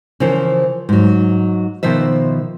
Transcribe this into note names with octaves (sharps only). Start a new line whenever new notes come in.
C#3 E3 F3 A#4 C5
G#2 F#3
B2 D#3 F3 C5 E5